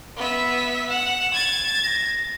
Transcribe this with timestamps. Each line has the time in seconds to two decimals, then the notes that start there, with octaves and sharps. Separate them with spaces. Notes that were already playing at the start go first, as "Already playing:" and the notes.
0.17 B3 E5
0.90 F#5 E7
1.34 G#6 A6
1.84 A#6